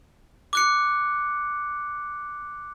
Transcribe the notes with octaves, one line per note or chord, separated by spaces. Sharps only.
D6 F#6 C#7